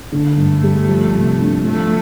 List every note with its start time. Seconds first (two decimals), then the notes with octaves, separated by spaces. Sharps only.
0.12 D3 A3
0.37 G2
0.63 G3
0.88 F3
1.14 C3
1.40 D4
1.65 F3 A3